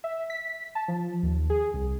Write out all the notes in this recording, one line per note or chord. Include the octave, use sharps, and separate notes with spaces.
E5
B6
A5
F3
D#2
G#4
C2